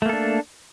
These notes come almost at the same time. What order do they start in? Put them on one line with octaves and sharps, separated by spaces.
A3 A#3 A4 D4